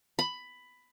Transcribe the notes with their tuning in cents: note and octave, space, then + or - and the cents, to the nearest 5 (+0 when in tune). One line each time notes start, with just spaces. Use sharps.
B5 +10